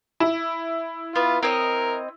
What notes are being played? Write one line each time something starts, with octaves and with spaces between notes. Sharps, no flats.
E4
B3 F4
C4 A#4 C#5 D#5